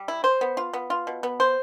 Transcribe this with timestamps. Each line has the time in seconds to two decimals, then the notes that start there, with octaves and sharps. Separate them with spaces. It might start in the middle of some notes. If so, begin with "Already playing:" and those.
Already playing: G3
0.08 E4
0.24 C5
0.41 B3
0.57 F4
0.73 B3
0.90 F4
1.07 B2
1.23 B3
1.40 C5